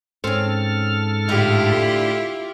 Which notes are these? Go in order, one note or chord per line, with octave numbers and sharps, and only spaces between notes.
G#2 C4 C#4 A4 F6
A2 D3 E4 F4 G4